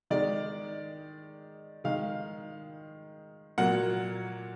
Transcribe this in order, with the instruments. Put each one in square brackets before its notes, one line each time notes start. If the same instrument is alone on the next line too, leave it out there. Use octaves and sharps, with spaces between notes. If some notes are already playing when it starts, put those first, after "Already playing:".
[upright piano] D#3 G#3 D5
D#3 G#3 F5
A#2 F#3 A#3 F#5